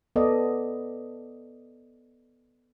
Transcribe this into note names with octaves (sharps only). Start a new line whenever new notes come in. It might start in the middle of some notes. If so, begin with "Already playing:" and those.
B3 A4 D5 D#5